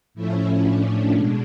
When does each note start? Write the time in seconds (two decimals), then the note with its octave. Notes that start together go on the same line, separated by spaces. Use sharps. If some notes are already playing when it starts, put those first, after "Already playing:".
0.14 A2 F3 A3 C#4 E4
0.64 D4
1.14 B2 G#3